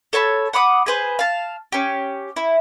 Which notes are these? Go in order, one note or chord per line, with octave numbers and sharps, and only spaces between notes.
A4 C#5 A5 B5
F#5 B5 D6 D#6
G#4 B4 C5
F5 A5
C#4 G4
E4